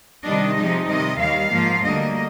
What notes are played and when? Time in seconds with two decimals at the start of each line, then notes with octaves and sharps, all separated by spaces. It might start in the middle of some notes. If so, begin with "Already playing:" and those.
0.25 C3 D#3 G3 D4 D#5
0.57 C3 F3 G#3 D#4
0.89 C3 D#3 G3 D#5
1.20 D#2 D#3 G3 F5
1.53 G#2 F3 A#3 F4
1.85 D2 D3 G3 A#3 D#5